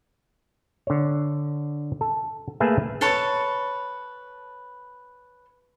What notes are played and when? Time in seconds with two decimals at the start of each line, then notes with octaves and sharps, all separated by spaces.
0.87 D3 C#5
2.01 A4
2.60 A3 A#3 G#4 B4 E5
3.01 A4 B4 C#5 A5